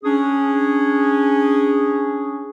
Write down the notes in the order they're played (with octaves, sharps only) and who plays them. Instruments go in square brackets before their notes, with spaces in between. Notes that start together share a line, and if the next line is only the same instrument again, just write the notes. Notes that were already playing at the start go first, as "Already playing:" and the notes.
[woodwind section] C#4 D4 G#4